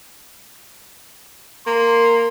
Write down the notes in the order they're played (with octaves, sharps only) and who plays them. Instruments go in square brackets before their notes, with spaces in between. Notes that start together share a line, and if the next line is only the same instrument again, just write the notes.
[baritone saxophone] A#3 [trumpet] C6